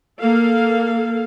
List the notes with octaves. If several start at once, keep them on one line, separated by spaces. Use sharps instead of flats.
A#3 A4 F5